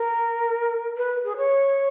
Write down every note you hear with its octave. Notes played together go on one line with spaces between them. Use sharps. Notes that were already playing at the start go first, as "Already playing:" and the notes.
Already playing: A#4
B4
G#4
C#5